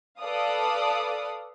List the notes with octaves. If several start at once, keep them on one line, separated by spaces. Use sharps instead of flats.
A4 B4 D5 F5 D#6